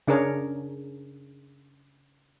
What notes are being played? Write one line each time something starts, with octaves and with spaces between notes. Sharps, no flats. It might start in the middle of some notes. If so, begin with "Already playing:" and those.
C#3 D4 G#4 A#4 C#5